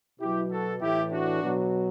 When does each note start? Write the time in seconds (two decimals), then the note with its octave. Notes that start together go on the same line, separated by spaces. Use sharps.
0.20 B2 F#3 E4 G4
0.51 F#4 A4
0.81 A2 E3 E4 G4
1.12 D4 F#4
1.43 B2 F#3